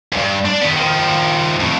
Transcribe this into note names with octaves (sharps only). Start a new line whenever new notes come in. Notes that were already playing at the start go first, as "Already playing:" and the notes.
D2 G2
D4 D5
D#3 B3
D#3 F3
F2 A2